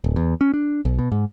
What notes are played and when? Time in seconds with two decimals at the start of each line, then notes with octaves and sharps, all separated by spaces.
0.04 D1
0.16 E2
0.41 C#4
0.54 D4
0.85 B1
0.99 B2
1.12 G#2